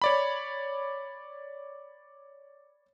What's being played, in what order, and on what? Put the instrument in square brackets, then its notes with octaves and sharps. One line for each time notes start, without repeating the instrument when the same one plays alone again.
[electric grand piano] C#5 D5 B5